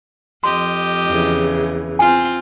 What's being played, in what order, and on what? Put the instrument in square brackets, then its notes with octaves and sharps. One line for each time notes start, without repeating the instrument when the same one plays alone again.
[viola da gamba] F2 G4 D#5 [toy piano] C6
[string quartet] E2 C#3 E3
[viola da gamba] C4 F4 [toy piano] G#5